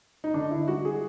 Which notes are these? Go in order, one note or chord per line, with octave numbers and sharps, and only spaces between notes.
D#4
D3 D4
E4
G3 F#4
G#4